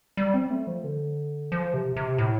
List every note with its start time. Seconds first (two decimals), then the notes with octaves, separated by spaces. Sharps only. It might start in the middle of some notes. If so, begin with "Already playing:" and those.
0.17 G3
0.34 C4
0.50 A3
0.67 F3
0.84 D3
1.52 F3
1.74 C3
1.96 C3
2.18 A2